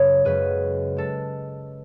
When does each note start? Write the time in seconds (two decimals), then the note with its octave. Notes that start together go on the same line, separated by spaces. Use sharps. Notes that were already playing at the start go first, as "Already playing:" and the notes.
Already playing: F#2 C#3 G#3 A4 B4 C#5
0.25 F#2 C#3 G#3 G#4 B4
0.97 G#3 A4